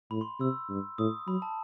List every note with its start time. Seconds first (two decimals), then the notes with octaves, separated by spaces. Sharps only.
0.11 A2 B5
0.21 C6
0.40 C3 E6
0.70 G2
0.98 A2 D#6
1.28 F#3 B5
1.42 A5